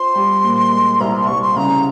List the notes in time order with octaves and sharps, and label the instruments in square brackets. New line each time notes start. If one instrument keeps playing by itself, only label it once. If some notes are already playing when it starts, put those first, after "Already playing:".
Already playing: [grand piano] F4 C5 [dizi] C6
[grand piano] G3
A#2
G#3
[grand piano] C2 [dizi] A#5
[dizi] C6
[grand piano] C2 [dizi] C#6
[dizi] C6
[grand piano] C#3 [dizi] A#5